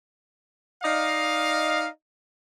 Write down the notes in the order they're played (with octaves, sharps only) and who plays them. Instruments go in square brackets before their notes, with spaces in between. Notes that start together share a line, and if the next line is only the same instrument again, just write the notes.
[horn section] D#4 D5 D#5 F5